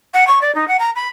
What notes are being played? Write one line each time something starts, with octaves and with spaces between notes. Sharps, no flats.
F#5
C#6
D5
D#4
F#5
A#5
B5